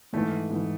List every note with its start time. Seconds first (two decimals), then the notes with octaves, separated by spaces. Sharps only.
0.13 G#2 E3 A3
0.50 G#2 E3